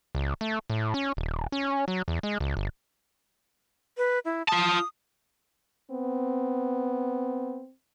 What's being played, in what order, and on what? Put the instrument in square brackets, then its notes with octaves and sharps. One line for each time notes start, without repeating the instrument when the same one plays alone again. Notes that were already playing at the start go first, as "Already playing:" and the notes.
[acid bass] C#2
A3
A2
C#4
D#1
C#4
F#3
E2
G#3
C#2
G1
[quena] B4
E4
[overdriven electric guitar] F4 A5 [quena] D#6
[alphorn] B3 [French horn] C4